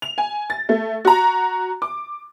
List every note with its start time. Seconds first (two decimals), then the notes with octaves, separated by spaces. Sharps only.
0.02 F7
0.18 G#5
0.50 A6
0.69 A3
1.05 F#4 A#5
1.82 D6